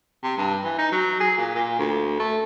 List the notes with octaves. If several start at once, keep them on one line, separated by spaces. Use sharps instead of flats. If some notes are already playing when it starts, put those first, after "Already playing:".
C3
G2
E3
D#4
F#3
G#4
A#2
A#2
D2
A3